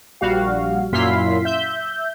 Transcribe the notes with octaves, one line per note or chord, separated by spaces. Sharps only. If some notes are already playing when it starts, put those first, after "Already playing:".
A#1 G3 F#4 F5
F#2 A#2 E4 F5 C6 B6
E5 G6